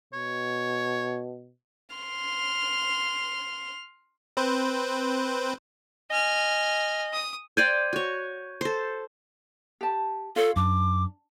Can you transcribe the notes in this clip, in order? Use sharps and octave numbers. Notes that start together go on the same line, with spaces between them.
B2 C#5
C6 F6
C4 B4 C5
D#5 G#5 F6
D#6
C5 D5 G5 G6 G#6 D#7
F#4 C#5
A4 C5
G4 A5
F4 A4 C#5 F5
F#2 D4 D6